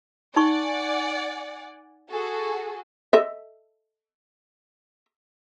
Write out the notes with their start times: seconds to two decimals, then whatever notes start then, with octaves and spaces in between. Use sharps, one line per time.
0.36 D#4 D5 F#5 G#5 C#6
2.11 F#4 G#4 A4
3.13 A4 D#5 E5